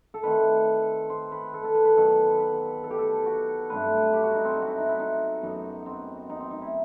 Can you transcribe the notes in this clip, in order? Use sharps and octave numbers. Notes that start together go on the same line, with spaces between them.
A4
D#3 A3 C4 B4
C5
B4
A4
A4
B4
B4
D#3 F#3 B3 A4
B4
A4
G4
A4
F#4
G2 F#3 A3 C4 B4
G4
F#4
D#4
C4
D#4
E4 F#4
D#4
E4
D#4
F#2 F#3 B3 D#4
C4
D#4
C4
D#4
E4